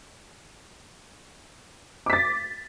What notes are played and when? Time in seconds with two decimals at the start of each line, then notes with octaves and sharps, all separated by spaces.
2.06 D6
2.10 B6
2.13 A6